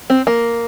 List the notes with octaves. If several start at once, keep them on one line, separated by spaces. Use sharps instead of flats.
C4
A#3